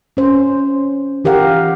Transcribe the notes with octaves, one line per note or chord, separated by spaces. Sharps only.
C#4 C5
E3 G4 A#4 F5 F#5